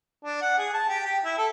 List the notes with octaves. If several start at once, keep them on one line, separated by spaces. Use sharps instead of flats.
D4
F#5
G#4
A5
G4
G4
E4
A4